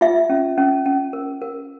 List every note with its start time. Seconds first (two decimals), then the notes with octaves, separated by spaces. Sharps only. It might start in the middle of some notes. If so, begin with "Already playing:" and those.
0.01 F4 E5
0.29 C#4
0.58 C#4
0.86 C#4
1.13 A#4
1.41 A#4